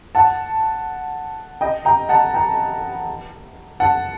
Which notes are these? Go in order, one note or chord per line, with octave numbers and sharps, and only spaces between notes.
F#5 A5
D#5 G5
G5 A#5
F#5 A5
G5 A#5
F#5 A5